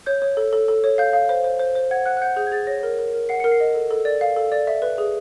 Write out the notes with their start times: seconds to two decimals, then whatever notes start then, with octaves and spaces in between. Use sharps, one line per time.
0.06 C#5 G6
0.22 C#5
0.37 A4
0.53 A4
0.68 A4
0.84 C#5
0.98 F5 G6
1.13 F5
1.29 C5
1.44 C5
1.59 C5
1.75 C5
1.91 F#5 G#6
2.06 F#5 F#6
2.17 F#6
2.22 F#5 G6
2.36 G#4 G6
2.47 G#6
2.52 G#4 A6
2.67 C#5 A#6
2.83 A#4
2.99 A#4
3.14 A#4
3.29 F#5 C7
3.40 A#4 C#7
3.52 C7
3.60 D#5
3.74 A4
3.91 A4
4.05 D5
4.21 F5
4.36 A4
4.52 D5
4.67 E5
4.82 B4
4.98 G#4